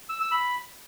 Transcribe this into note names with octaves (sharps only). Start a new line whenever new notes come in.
E6
E6
B5